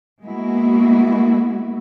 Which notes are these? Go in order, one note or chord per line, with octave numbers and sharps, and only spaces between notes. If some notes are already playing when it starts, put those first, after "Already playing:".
G#3 A#3 B3 E4 F#4